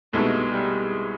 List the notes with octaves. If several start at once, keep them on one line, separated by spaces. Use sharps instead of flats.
C2 B2 G#3 A3 B3 D#4
G3